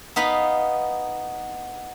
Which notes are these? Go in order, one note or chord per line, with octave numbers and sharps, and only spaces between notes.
B3 D#4 F5 B5